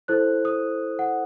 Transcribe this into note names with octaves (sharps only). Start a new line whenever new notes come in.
E4 A4 C5 F#6
D#6
F#5